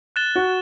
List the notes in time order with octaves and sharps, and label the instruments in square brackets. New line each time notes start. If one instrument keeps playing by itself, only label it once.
[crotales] F#6 A6 E7 G7
[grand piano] F#4